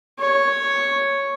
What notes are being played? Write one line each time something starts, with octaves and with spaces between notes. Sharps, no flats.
C#5